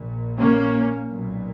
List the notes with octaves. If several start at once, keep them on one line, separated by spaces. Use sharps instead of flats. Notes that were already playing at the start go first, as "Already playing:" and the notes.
Already playing: A#1 A#2
A#3 C#4
B1 A#2